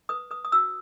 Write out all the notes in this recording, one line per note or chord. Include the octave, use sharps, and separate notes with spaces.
B4 D#6
B4 D#6
D#6
F#4 E6